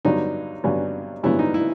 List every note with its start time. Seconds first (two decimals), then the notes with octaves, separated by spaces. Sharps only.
0.05 G2 D3 F#3 B3 D4 D#4
0.64 G2 D3 F#3 B3 D4
1.23 G2 D3 F#3 B3 D4 E4
1.39 D#4
1.54 E4